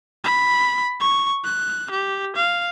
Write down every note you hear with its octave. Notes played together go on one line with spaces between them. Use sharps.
B5
C#6
F#6
G4
F5